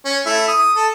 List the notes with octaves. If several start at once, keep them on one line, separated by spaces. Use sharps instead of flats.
C#4
A3 E4
D#6
A4